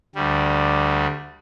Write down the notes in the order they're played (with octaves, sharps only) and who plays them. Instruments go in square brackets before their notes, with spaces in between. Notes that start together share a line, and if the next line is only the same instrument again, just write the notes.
[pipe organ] D2 G3